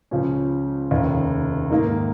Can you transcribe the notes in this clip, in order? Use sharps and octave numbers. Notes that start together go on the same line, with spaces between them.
C#2 C#3 F3 C#4
F1 D#2 C#3
G#2 D#3 A#3